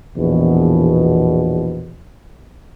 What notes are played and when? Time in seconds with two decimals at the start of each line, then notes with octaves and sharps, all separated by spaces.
0.17 A#1 E2 B2